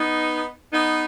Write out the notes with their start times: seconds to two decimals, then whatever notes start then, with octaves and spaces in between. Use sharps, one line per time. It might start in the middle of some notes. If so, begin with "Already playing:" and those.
Already playing: B3 D#4
0.73 B3 D#4